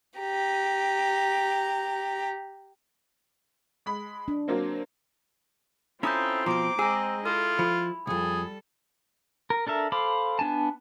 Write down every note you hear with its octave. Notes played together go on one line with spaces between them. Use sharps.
G4 A#5
G#3 B5
D4
F#3 A#3 C4
C4 C#4 E4 F4 A4 A#5 D#6 G6
B2 F3 A#5 D6 D7
G#3 C4 G#4 D#5 A#5 E6
E4 F4 A4
F3 B5
C2 F2 G3 G#4 A4
A#4
D4 A4 A#4 E5
A4 C5 F5 B5 D6
B3 D4 G#5 A5